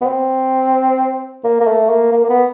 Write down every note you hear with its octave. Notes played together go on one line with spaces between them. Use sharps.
B3
C4
A#3
A#3
A3
A#3
A#3
A#3
B3